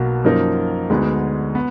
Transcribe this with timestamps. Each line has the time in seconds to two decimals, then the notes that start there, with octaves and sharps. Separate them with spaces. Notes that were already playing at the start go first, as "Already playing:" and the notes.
Already playing: B1 B2 A#3
0.24 F#2 F3 A#3 D#4 A#4
0.90 D2 D3 G#3 B3 D#4
1.55 B3